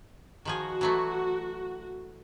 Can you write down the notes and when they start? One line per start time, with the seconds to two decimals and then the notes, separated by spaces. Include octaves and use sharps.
0.45 D#3 F3 F#4 G#4
0.81 E3 F#3 A3